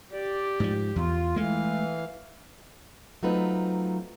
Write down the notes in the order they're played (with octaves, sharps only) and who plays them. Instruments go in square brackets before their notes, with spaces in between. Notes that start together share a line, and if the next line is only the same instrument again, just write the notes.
[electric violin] G4 [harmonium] D5
[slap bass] G#2 F3
[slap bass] E2 [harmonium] F4
[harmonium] E3 [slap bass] G#3 A3 [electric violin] F5
[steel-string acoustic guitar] F#3 A3 C4 D#4 F4 B4